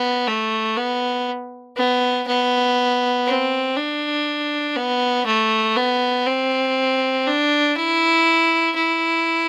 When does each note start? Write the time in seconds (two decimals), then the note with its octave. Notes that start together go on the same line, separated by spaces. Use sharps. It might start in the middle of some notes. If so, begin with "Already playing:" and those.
Already playing: B3
0.27 A3
0.77 B3
1.77 B3
2.27 B3
3.27 C4
3.77 D4
4.76 B3
5.26 A3
5.76 B3
6.26 C4
7.26 D4
7.76 E4
8.76 E4